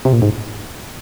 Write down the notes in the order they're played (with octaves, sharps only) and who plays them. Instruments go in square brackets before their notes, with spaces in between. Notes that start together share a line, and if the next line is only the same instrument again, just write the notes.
[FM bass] C3
A#2
G#2